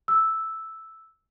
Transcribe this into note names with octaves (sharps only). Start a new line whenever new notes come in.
E6